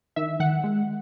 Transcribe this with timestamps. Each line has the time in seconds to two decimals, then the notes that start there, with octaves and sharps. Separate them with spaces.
0.16 D#3 E5
0.40 D#3 F#5
0.64 G#3